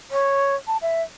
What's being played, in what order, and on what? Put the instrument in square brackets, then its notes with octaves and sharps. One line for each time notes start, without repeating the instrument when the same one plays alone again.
[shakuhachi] C#5
A5
E5